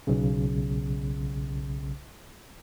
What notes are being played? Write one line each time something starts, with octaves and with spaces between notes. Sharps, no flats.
B1 C#3